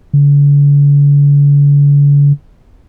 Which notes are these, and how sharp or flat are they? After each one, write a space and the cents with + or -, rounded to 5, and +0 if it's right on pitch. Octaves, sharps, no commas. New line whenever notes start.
D3 -45